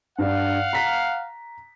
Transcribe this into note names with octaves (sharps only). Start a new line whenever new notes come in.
G2 D4 F5 F#5
A#5 B6